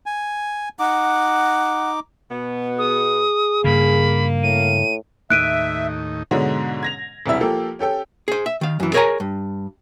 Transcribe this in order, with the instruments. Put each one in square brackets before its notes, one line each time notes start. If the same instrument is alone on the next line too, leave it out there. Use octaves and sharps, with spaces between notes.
[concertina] G#5
[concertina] D#4 D6 [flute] F#5
[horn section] B2 B3
[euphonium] G#4 [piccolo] D#6
[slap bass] G2 C#3 [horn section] A#3 [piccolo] B5
[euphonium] A2 [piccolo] D#7
[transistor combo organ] D#2 A2 D#4 [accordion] E5 [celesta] F#6 D7 D#7
[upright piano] G#2 B2 D3 F#3 G#3
G#6 A#6 F7
E1 C2 G3 E4 E5
F3 A#3 G4 A4
C#4 G4 A4 G5
[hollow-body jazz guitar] G#4 C5
E5
D#3 F5
F#2 E3
G#4 A#4 C#5 D#5 G#5 A#5
G2